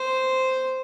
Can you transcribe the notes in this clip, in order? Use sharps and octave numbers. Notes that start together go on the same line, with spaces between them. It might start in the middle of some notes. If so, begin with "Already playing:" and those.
Already playing: C5